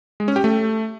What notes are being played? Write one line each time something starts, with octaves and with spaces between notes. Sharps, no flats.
G#3
C#4
G4
A3